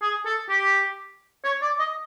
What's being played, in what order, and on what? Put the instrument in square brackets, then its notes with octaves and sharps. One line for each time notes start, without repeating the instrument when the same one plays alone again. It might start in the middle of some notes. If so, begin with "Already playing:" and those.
[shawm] G#4
A4
G4
C#5
D5
D#5